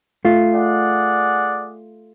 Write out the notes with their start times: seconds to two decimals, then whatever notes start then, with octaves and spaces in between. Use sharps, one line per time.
0.25 A3 F4
0.54 G#4 D5 F#5